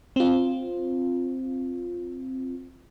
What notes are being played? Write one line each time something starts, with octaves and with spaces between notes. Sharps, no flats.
C4 F4